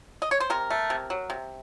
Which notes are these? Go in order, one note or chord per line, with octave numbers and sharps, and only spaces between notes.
D#5
C#5
C5
C3 A#4
A3
C3
F#3
C3